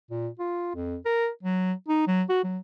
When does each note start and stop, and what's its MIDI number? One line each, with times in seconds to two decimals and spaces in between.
0.11 0.28 46
0.39 0.71 65
0.75 0.96 41
1.05 1.28 70
1.43 1.73 54
1.88 2.03 63
2.07 2.23 54
2.29 2.42 66
2.44 2.58 54